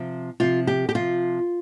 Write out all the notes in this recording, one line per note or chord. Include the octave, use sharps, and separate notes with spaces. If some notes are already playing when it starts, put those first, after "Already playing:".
Already playing: C3 F3
C3 F3 F4
G4
G4
C3 F3 F4